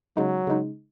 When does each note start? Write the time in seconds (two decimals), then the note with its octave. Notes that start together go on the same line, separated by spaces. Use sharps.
0.17 C#3 F#3 G#3 D#4
0.47 C#3 G#3 D#4